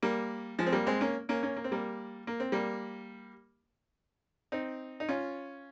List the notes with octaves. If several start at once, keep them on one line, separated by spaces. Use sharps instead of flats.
G3 A#3
F3 G#3
C4
G3 A#3
G#3 C4
A#3 C#4
A#3 C#4
A#3 C#4
A#3
C4
G3 A#3
A#3
C4
G3 A#3
C4 D#4
D#4
C#4 F4